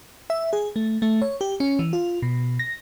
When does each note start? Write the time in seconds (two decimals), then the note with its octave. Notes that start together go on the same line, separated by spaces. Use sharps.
0.30 E5
0.53 G#4
0.76 A3
1.02 A3
1.22 C#5
1.41 G4
1.60 C#4
1.79 E3
1.93 F4
2.22 B2
2.59 A#6